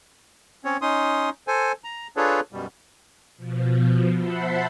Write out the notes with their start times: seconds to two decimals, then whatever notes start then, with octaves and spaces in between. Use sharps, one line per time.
0.65 C4 C#4 C#5
0.82 C#4 D#4 C6 D#6
1.48 A4 C5 G#5
1.84 A#5
2.17 D4 F4 G#4 A4 B4 C#5
2.53 F#2 B2 G3
3.37 B2 F3
4.17 C5 E5 F#5 A5 B5 C6